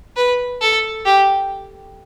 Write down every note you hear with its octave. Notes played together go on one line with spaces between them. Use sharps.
B4
A4
G4